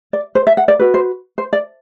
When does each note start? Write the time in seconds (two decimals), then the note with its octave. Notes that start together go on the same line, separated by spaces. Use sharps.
0.13 D5
0.35 C5
0.47 E5
0.57 F#5
0.68 D5
0.79 F#4 B4
0.94 C5
1.38 C5
1.53 D5